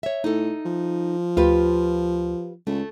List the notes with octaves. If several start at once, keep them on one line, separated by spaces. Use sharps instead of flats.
C#5 E5
A2 D#4 A4
F3
D2 F4 G4 B4
C#2 A3